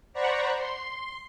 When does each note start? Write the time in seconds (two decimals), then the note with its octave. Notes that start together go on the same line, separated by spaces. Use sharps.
0.13 C5 D5 F#5 A#5 B5 C#6
0.57 C6